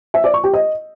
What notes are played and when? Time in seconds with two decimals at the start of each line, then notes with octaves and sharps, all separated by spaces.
0.14 E5
0.24 D5
0.34 C#6
0.44 G4
0.54 D#5